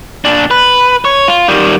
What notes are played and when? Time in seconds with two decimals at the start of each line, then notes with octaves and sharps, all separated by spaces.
0.25 A#2 D4
0.51 B4
1.05 C#5
1.28 F4
1.48 D#3 G3